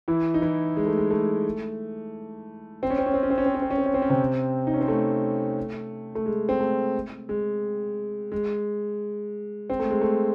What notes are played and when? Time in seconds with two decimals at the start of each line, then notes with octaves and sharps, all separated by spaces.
0.08 E3 E4
0.34 D#4
0.42 E3 E4
0.77 G#3
0.87 A3
0.97 G#3
1.11 A3
2.83 C4
2.90 C#4
2.99 C4
3.06 C#4
3.14 C4
3.23 C#4
3.30 C4
3.38 C#4
3.46 C4
3.54 C#4
3.62 C4
3.70 C#4
3.78 C4
3.86 C#4
3.94 C4
4.02 C#4
4.10 C3 C4
4.67 D#4
4.74 C#4
4.81 C4
4.88 A3
6.15 A3
6.26 G#3
6.49 C4
6.60 A3
7.29 G#3
8.32 G#3
9.70 C4
9.79 A3
9.90 G#3
10.01 A3